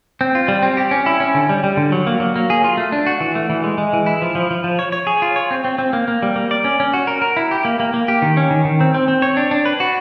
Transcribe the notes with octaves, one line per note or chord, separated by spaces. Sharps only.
C4
F4
G3
C4
G4
C#4
E4
C#4
D3
G3
G3
D3
F#3
A#3
F#3
A#3
G#4
F4
A3
D4
F#4
E3
A3
E3
G#3
G#3
E3
E4
F3
F3
F3
F3
C#5
C#5
G#4
F4
C#5
C4
C4
C4
A#3
A#3
G3
A#3
D5
C#4
C#4
F#4
A#4
A#4
E4
G4
A#3
A#3
A#3
G4
D#3
C#4
D#3
D#3
C4
C4
C4
C#5
D4
D4
B4
F#4